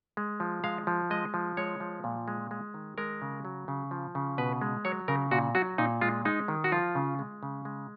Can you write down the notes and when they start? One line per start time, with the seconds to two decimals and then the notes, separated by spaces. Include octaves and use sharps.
0.17 G#3
0.40 F3
0.64 G#3 F5
0.87 F3
1.10 G#3 D#5
1.34 F3
1.57 G#3 C#5
1.80 F3
2.04 A#2
2.28 G#3
2.51 G#3
2.74 D#3
2.98 G#3 A#4
3.22 C#3
3.45 F#3
3.68 C#3
3.91 F3
4.15 C#3
4.38 B2 B4
4.62 G#3
4.85 F#3 C#5
5.08 C#3 A#4
5.31 A#2 F#4
5.55 F#3 F#4
5.78 A#2 D#4
6.01 G#3 F4
6.25 G#3 D#4
6.48 D#3
6.64 F#4
6.72 F3 F4
6.95 C#3
7.19 G#3
7.43 C#3
7.65 G#3